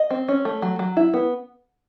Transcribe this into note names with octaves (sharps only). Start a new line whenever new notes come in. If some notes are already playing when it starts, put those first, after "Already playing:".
Already playing: D#5
C4
C#4
A3
F#3
F#3
E4
B3